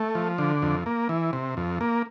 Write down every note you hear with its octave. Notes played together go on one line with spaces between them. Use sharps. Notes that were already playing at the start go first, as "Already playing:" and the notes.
Already playing: A3
F3
D3
F2
A#3
E3
C3
F2
A#3